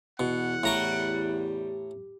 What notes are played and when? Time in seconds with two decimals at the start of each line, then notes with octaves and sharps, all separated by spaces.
0.19 E2 B2 F#5
0.64 A2 G3 A#5 C#6